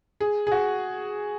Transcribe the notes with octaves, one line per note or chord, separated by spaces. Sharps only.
G#4
G#4
F#4